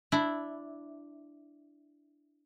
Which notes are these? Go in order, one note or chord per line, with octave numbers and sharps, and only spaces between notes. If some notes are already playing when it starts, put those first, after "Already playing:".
D4 E4